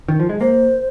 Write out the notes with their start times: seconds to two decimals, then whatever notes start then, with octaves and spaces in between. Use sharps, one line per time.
0.08 D#3
0.20 F3
0.29 G#3
0.40 A#3 C5